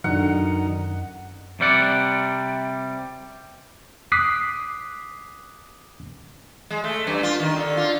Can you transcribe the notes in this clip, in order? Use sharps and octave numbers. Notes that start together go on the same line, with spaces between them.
F#2 D3 D#3 F#3 D#4 F#5
C3 G3 D5 F#5
D6 D#6 F#6 B6 C7
G#3
A3
G2
F4
D#3
D3
F4